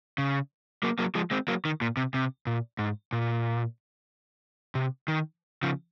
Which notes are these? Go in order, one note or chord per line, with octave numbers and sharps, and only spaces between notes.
C#3
F#3 A#3
F#3 A#3
F3 G#3
G#3 C4
F#3 A#3
D#3
A#2
C3
C3
A#2
G#2
A#2
C3
D#3
C#3 F3